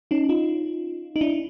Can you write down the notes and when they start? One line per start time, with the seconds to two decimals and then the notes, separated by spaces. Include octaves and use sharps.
0.11 C#4 D#4
0.29 D#4 F4
1.16 D#4
1.21 D4 E4